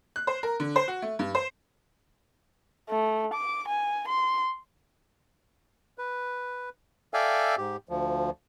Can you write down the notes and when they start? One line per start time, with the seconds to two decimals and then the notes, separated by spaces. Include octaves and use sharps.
0.16 F#6
0.27 C5
0.43 A#4
0.60 D3
0.76 C5
0.88 F#4
1.02 A3
1.19 G2
1.35 C5
2.90 A3
3.34 D6
3.68 G#5
4.08 C6
5.98 B4
7.14 A4 D5 E5 F5 G5 G#5
7.58 G#2 G4
7.89 D2 F3